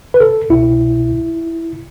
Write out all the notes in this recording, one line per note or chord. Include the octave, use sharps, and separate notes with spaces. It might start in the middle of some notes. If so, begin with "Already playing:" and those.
B4
A4
C2 B2 E4